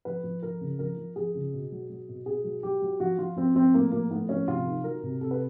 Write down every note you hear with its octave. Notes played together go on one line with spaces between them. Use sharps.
F3 B4
F3
F3 A#4
C#3
F3 A#4
F3
F3 G#4
C#3
B2
F#3
F#3
B2
B2 G#4
F#3
F#3 G4
F#3
F3 F#4
F3 F4
F3 C4
F3 C4
A2 A#3
F3 A#3
A2 B3
F3 C#4
C3 F4
D#3
F#3 A#4
C3
C3 A4
B4